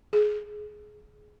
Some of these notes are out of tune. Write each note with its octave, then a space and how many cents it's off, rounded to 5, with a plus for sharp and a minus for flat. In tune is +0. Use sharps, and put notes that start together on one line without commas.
G#4 +20